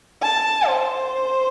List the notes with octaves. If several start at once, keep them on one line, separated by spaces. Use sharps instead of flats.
A5
C5